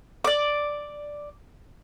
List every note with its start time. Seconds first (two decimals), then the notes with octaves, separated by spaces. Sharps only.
0.24 D5 D6